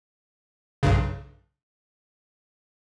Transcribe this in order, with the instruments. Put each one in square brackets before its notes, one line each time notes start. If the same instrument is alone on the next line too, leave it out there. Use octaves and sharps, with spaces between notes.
[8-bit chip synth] B1 G2 C#3